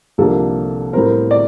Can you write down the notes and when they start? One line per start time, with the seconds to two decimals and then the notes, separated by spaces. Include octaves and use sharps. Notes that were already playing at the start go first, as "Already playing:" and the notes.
0.18 C2 C3 F3 A#3 D4 A4
0.93 A2 G3 C4 A#4
1.31 D5